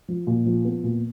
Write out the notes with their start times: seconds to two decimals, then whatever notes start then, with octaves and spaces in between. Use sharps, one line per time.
0.08 F3
0.27 A#2
0.46 F3
0.65 B3
0.84 A#2